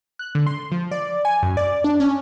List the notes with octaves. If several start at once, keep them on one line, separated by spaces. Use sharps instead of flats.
F#6
D3
C6
F3
D5
G#5
F#2
D5
D4
C#4